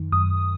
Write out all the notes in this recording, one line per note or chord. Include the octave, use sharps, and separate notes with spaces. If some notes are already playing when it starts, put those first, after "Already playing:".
Already playing: F#2 D#3
F#2 D#6